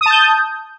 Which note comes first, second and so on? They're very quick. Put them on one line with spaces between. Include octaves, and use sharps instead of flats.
D#6 A5 G6